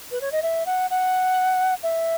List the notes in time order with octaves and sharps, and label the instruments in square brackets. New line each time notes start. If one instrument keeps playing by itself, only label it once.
[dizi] B4
C#5
D#5
E5
F#5
F#5
E5